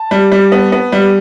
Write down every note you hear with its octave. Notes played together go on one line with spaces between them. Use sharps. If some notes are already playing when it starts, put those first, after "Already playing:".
Already playing: A5
G3
G3
B3
B3
G3